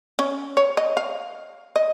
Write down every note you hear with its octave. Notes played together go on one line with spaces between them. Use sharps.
C#4
C#5
D#5
F5
D#5